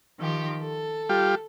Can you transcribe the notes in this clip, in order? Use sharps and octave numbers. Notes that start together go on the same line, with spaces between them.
D#3 F3 G4
A4
G3 F4 G4